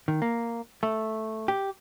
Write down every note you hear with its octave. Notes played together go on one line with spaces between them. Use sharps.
D#3
A#3
A3
G4